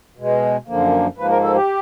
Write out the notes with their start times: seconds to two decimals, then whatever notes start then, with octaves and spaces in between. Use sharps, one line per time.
0.17 B2 G#3
0.67 F#2 D3 F3 A#3
1.17 G#2 F3 A#3 B4
1.29 A#4
1.43 A4
1.55 G4